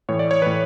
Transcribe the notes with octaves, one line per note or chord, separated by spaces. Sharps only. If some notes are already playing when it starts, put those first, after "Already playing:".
A2 E3 C#5
D5
C#5
A2 E3 B4